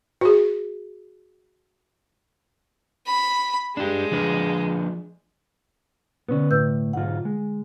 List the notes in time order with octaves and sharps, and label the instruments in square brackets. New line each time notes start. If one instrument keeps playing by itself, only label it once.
[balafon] F#4 G#4
[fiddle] B5
[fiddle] G#3 [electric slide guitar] D4 G4
[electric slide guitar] F3 D4 B4
[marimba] B2 D3 [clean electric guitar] B3 C#4
[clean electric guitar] A2 [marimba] B4 E6 G6
[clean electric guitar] B1 G#2 F4 [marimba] F#5
[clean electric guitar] G#3